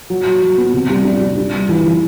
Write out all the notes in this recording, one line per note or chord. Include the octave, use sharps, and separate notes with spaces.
F#3
F#3
F#3
B3
C3
G3
D4
G3
D4
G3
E3
E3